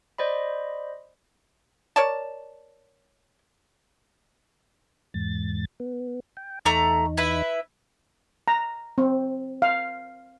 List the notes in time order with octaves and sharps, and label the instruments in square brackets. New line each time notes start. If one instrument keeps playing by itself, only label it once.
[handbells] C5 D5 D#5 B5
[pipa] A#4 C#5 D5 A5
[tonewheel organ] E2 G#2 A6
B3
G5
[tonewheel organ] E2 D#4 [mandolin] A3 A#5 D6
[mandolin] E4 B4 E5
[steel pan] A#5
C4
F5